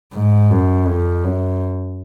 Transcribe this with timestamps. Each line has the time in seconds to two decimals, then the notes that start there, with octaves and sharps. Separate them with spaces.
0.14 G#2
0.51 F#2
0.87 F2
1.24 F#2